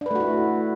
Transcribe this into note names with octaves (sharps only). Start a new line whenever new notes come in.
A3 D4 E4 F#4 B4